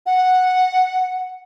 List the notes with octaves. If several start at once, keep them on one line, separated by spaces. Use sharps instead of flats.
F#5